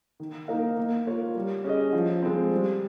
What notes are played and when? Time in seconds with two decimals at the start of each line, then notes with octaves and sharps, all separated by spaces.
0.20 D#3
0.48 A#3 D#4 A#4 F5
0.77 A#3
1.07 F4 A#4 C#5
1.35 G3
1.64 C#4 G#4 D#5
1.93 F3
2.23 G#3 C4
2.51 G3